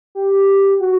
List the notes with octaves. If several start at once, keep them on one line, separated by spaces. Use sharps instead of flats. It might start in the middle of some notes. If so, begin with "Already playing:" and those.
G4
F#4